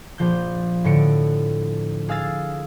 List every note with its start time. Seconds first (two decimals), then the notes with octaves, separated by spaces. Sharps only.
0.18 A#1 F3 G6
0.84 A2 D3 C#7 D7
2.09 G#4 F5 E6 A6